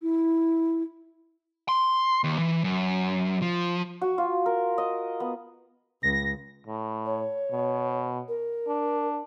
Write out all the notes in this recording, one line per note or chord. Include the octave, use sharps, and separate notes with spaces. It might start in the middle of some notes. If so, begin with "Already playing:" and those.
E4
C6
D#2
E3
F#2
F3
F#4
F4
A#4
D#5
B3
C#2 A#6
A2
C#5
B2
A#4
D4